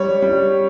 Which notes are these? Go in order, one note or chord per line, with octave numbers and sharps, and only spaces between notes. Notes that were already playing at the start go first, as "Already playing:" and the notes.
Already playing: G3 C#5
G3